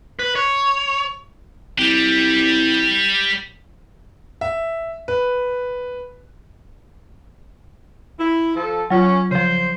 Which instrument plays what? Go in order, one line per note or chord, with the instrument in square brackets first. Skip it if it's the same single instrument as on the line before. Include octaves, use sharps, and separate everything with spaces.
[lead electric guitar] B4
C#5
[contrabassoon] C2 [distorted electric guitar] G3 G4
[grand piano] E5
B4
[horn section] E4
F3 A4
[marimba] F#3 F4 [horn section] C#4
[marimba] C#3 F3 [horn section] C5